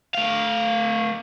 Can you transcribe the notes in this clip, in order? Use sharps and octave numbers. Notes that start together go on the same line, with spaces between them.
A3 F5